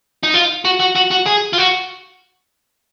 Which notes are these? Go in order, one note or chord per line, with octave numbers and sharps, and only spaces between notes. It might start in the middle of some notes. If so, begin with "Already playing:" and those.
D#4
F4
F#4
F#4
F#4
F#4
G#4
F4
F#4